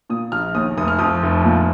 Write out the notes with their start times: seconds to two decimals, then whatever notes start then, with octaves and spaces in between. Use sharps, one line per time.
0.10 A#2 D#6
0.32 A#1 F6
0.55 D#2 D#6
0.77 F1 D#6
0.88 F6
0.99 F2 D#6
1.23 F1
1.44 A#2